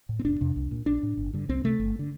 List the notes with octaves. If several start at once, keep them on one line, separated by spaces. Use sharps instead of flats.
A2
C4
F1 D4
F2 C3
C2
A#2
A#1 D4
A2
G1
G2 D3
C2 C4
C3 A3
G1
D3